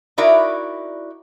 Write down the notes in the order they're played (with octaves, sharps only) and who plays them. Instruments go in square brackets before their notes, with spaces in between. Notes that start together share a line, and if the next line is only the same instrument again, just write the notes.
[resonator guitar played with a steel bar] D#4 E4 F#4 A#4 D5 E5